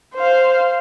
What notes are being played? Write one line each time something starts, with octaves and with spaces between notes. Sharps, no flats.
C5 F5